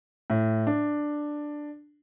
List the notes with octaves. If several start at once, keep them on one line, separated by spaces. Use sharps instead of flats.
A2
D4